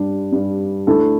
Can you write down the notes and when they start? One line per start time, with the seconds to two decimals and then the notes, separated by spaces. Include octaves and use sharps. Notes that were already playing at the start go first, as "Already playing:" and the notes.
Already playing: G2 G3 D4 G4
0.32 G2 G3
0.87 D2 D3 A3 E4 A4